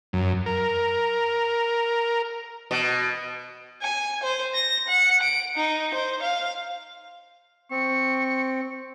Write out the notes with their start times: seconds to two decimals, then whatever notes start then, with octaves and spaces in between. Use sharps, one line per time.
0.13 F#2
0.46 A#4
2.71 B2
3.82 G#5
4.23 C5
4.54 A#6
4.88 F#5
5.22 D7
5.56 D#4
5.94 C5
6.22 F5
7.71 C4 C#6